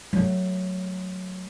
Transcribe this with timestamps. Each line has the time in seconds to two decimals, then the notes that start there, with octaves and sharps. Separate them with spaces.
0.13 F#3 A3